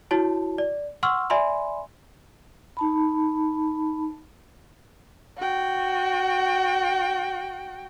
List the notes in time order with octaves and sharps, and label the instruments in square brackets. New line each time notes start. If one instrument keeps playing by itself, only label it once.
[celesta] E4 F#4 C#5 A5
D5
F#5 C6 C#6 E6 F6
D5 E5 G#5 B5 C6
[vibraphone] D#4 A5 B5
[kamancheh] F#4 G5